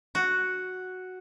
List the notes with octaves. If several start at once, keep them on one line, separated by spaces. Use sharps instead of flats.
F#4